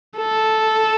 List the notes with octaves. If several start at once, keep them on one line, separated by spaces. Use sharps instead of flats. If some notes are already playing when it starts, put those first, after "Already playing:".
A4